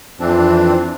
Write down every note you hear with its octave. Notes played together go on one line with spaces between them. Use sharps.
F2 E3 C4 D4